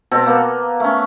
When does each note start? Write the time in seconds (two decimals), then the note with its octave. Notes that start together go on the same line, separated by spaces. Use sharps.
0.12 B2 C4 A4
0.26 A#3 B3
0.80 A3 C#4